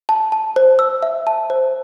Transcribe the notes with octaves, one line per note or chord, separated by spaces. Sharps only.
A5
A5
C5
E6
E5
A5
C5